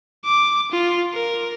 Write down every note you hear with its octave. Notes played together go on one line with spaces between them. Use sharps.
D6
F4
A#4